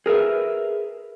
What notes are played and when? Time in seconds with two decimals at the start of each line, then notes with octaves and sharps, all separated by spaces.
0.06 G#4 A#4 B4 E5